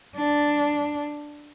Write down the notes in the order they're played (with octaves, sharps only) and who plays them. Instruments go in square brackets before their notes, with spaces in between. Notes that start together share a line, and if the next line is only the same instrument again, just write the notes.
[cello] D4